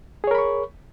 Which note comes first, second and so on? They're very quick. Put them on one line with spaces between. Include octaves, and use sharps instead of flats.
G#4 C#5 A#4 B5 C#6